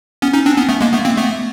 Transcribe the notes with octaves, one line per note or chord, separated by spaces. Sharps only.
B3 C#4
C#4 D#4
C4 D4
B3 C#4
A3 B3
G#3 A#3
A3 B3
A#3 C4
A3 B3